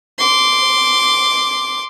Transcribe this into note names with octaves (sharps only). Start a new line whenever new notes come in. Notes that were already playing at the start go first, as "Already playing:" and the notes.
C6 D6